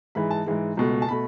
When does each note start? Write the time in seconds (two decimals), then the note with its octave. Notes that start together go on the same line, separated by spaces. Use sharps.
0.15 G#2 E3 G#3 B5
0.31 A5
0.46 G#2 E3 G#3
0.77 C#2 B2 A3
1.02 A5
1.08 B2 A3 B5